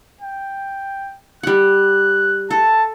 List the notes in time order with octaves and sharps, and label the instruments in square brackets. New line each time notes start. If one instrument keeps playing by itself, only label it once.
[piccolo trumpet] G5
[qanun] G3 F#5 [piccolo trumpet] F#6
[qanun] A4 [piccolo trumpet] A5